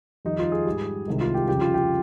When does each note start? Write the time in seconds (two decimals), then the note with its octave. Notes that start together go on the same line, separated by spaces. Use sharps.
0.25 F2 D#3 G3 D#4
0.39 F4
0.52 G#4
0.66 G#2 G3
1.08 C2 C3 D#3 G#3
1.21 F4
1.34 G4
1.48 F2 C#3 G3 G4
1.61 F4
1.74 G4